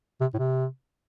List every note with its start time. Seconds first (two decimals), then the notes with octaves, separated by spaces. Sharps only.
0.21 C3
0.34 A2
0.39 C3